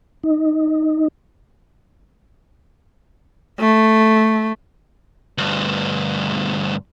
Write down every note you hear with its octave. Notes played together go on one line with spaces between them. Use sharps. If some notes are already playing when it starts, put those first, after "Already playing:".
D#4
A3
D2 G2